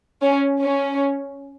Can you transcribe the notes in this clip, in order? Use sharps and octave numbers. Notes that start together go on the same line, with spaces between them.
C#4
C#4